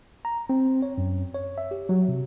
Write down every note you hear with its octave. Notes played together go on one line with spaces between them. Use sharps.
A#5
C4
C#5
F#2
C#5
E5
G4
F#3
C3